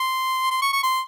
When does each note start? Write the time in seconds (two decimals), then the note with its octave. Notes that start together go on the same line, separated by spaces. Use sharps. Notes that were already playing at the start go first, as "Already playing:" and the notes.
Already playing: C6
0.51 C6
0.62 C#6
0.73 C#6
0.83 C6